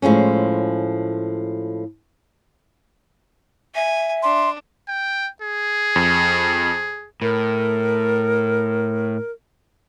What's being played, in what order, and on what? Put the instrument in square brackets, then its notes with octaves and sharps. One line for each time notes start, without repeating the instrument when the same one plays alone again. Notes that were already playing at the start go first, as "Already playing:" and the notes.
[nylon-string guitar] A2 F3 G#3 C#4
[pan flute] E5 [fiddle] G#5
[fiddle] D4 [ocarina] C6
[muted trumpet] G5
G#4
[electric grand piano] F2
[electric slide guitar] A2 [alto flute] A#4